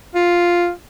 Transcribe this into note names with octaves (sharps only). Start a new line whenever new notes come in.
F4